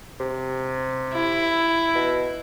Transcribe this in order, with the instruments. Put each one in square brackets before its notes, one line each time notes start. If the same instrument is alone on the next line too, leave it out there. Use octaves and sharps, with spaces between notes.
[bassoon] C3
[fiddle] E4
[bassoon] B2